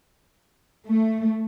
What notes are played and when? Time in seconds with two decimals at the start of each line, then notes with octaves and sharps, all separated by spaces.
0.87 A3